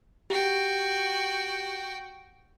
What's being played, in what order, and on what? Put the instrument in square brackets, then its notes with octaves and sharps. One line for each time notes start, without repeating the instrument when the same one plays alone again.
[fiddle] F#4 G5 [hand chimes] G4